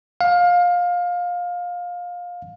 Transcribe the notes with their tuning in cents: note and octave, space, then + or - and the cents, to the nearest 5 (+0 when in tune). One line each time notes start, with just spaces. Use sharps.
F5 +20